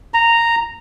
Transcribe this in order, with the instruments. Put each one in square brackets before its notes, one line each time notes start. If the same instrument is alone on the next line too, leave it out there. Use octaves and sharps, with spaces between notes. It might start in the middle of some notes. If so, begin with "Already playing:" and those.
[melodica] A#5